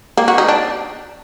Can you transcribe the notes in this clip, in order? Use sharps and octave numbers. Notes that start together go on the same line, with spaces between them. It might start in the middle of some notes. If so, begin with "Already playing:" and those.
A#3
F#4
D#4
D4